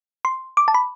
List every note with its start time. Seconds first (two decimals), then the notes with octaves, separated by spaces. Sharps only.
0.25 C6
0.57 D6
0.68 A5
0.74 B5